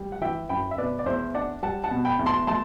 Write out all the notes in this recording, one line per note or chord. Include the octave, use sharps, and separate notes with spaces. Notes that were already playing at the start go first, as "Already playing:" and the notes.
Already playing: G3
F#5
E3 E5 G5
F#2 G5 B5
E5
B2 B4 D5
D5
E2 C5 E5
D4 D5 F#5
G3 F#5 A5
F#5 A5
B2
G5 B5
E2
A5 C6
A3 A5 C6